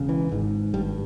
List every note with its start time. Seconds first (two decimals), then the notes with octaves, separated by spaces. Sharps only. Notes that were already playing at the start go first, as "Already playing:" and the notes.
Already playing: E1 C#3
0.09 E3
0.32 G#1 G#2
0.74 G#1 G2 G3